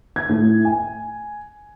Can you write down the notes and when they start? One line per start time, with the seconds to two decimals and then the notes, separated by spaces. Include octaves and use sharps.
0.16 G#6
0.29 A2
0.65 G#5